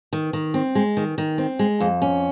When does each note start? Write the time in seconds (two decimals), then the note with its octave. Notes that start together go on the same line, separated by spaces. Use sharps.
0.13 D#3
0.33 D#3
0.54 C4
0.75 G#3
0.97 D#3
1.18 D#3
1.38 C4
1.59 G#3
1.80 F2
2.02 C#4